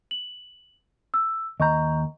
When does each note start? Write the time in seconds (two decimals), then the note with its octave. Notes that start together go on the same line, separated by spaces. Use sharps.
0.11 F#7
1.14 E6
1.60 D#2 D#5 A#5 C#6 G6